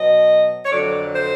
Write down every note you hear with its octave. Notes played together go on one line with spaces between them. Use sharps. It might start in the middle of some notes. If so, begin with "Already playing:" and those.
Already playing: B2 F#3 D#5
C#5
F2 D3 F#3 D5
C5